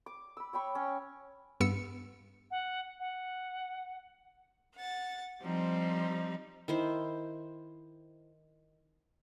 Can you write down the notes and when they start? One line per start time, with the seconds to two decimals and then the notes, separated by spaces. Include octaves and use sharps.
0.06 D6
0.37 B5 E6
0.53 C#5 G5 B5 C#6
0.75 C#4
1.61 G2 B3 E6 C#7
2.51 F#5
3.00 F#5
4.74 F#5 A6
5.41 F3 G3 C4 D#4
6.68 D#3 E4 C5